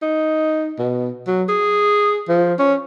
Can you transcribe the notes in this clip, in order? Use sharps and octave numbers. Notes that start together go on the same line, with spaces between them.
D#4
B2
F#3
G#4
F3
C#4